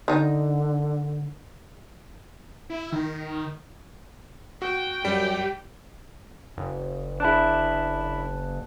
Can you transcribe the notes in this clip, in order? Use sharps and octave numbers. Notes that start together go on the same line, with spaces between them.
D3 D#3 D#4
E4
D#3
F#4 G5
F#2 G3 G4
F#1
D4 E4 G#4 A5 F#6